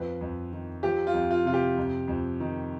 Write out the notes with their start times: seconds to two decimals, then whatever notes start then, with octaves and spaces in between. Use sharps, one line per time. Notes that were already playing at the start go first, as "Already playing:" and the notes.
Already playing: F2 F3 B4
0.21 F2
0.52 D#3
0.83 F3 G4
1.07 F4
1.14 F2
1.31 F4
1.45 C3 F4
1.53 G4
1.77 F2
2.08 F2
2.40 D#3